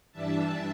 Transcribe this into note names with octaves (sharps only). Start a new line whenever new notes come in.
G2 E3 G3 D4 E5 A5